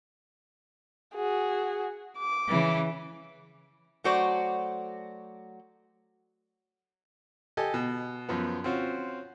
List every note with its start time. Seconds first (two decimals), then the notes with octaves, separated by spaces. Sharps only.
1.14 F#4 G#4
2.19 D6
2.48 C#3 E3
4.04 F#3 A3 F#4 C5 D5
7.57 G4 A4 D#5 G#5
7.74 B2
8.29 F#2 F3 B3
8.64 C4 C#4 F4 F#4